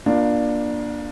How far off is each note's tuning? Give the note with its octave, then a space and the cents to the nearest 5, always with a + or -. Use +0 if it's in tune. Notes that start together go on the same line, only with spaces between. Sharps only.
A#3 +35 D4 +15 F4 +5